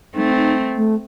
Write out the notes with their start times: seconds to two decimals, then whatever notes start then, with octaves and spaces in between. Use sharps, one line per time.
0.15 A3 C4 D#4
0.36 D#4
0.77 A3